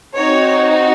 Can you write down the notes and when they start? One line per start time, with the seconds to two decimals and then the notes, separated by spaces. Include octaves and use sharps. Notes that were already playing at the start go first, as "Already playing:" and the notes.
0.16 C4 D#4 F#4 C#5